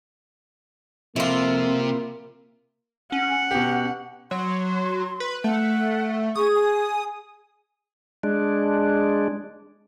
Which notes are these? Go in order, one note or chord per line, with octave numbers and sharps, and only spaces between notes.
F2 C3 A#3 E4 F4
C#4 F#5
B2 G4
F#3 C6
B4
A3 F#5
G#4 C#6 D#6
G#5
G#3 D4